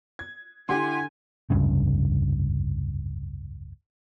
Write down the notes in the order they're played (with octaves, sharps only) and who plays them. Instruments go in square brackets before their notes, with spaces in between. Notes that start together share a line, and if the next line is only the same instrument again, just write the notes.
[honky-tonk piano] G#6
[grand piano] D3 [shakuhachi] E4 [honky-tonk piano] G4 F#5 C6 [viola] G#5
[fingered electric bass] F1 C#2 G2 C#3